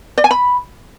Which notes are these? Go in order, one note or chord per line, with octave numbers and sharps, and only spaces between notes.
D5
G#5
B5